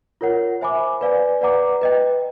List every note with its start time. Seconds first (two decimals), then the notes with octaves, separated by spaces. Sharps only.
0.21 F4 A#4 C#5 F#5
0.61 C5 E5 G#5 B5 D6
1.01 B4 D5 F5 G#5
1.41 B4 D5 F#5 A#5 D6
1.81 B4 D#5 G5